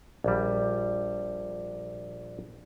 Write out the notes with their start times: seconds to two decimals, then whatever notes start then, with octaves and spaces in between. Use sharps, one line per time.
0.24 A#1 G3